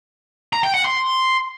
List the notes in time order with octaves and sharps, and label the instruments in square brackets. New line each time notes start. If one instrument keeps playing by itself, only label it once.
[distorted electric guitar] A#5
G5
F#5
C6